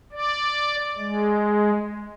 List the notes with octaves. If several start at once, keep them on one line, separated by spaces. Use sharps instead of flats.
D5
G#3